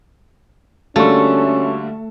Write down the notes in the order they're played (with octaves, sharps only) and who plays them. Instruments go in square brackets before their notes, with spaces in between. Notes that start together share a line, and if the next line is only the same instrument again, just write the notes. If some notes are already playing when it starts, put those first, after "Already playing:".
[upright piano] D3 G3 A#3 [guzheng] A3 [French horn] C#4 [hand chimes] F#4 C#6